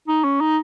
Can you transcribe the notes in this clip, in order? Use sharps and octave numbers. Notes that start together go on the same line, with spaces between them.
D#4
C#4
D#4